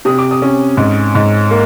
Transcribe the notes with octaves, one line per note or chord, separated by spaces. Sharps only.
C3 D#6
D6
D#6
C#4
G#2
G#2
A#3